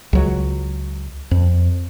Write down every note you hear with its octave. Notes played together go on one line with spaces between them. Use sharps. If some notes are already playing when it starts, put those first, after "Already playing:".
C#2 F#3
F2